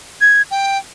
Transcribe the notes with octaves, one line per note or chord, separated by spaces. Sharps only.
G#6
G5